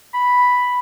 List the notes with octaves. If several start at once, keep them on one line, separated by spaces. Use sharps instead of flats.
B5